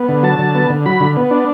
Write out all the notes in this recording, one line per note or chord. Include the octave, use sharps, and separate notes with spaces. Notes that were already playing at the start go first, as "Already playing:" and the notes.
Already playing: B3
D3
F#3 A5
D3
B3
D3
F#3 B5
D3
B3
D4